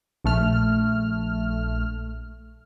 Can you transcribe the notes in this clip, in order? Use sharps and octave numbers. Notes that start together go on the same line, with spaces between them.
A#1 A3 F6